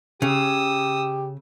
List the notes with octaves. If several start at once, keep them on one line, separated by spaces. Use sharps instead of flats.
C#3 G4 D#6 E6